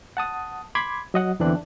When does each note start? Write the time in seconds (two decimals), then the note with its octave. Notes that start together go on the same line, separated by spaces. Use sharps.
0.17 F#5 A5 D#6
0.75 B5 C6 D6 G#6
1.14 F#3 D#5 F#5
1.40 E2 D3 E3 C4 D4 F#6